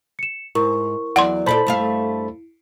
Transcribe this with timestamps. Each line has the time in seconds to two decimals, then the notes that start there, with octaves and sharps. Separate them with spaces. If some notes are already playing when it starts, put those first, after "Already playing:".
0.19 C#7 E7
0.55 G#2 E4 A#4 C#6
1.16 E2 F#3 E4 D5 F#5 C6
1.46 A#2 A4 C5 D5 A5 B5
1.67 G2 A3 F5